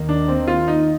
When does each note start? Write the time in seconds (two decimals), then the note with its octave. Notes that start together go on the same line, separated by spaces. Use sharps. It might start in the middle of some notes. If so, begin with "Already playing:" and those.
Already playing: D#2 D#3 A#3
0.09 D4
0.28 C4
0.48 F4
0.68 D#4